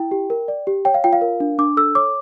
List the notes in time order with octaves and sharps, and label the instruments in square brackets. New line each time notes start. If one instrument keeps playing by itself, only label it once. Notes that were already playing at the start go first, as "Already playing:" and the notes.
Already playing: [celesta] E4 G5
G4
A#4
D5
G4
C#5 G5
F5
F4 G5
F5
A#4
D4
D4 D6
A4 E6
C#5 D6